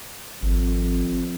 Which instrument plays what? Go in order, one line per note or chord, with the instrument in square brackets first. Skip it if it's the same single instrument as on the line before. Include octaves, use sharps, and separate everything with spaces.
[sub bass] G#1 [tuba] F2